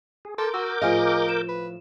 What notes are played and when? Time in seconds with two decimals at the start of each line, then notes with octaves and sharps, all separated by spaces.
0.25 G#4
0.38 A4 A#4 C6 D6 G6
0.54 F#4 F#5 E6
0.82 A2 F3 G#4 D#5 F5 G#5
1.29 E7
1.49 B4